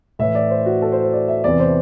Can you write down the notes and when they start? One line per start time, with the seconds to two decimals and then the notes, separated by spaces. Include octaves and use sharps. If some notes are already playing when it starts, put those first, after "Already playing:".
0.19 A2 E3 E5
0.35 D5
0.51 C5
0.66 F#4
0.82 A4
0.92 C5
1.02 C5
1.13 D5
1.28 E5
1.44 E2 C3 E3 D5
1.60 C5